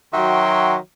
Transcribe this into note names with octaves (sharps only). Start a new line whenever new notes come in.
D#3 F#3 F#4 E5 G5 C6